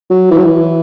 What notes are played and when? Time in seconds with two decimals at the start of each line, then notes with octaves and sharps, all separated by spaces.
0.10 F#3
0.31 E3
0.38 F#3
0.44 E3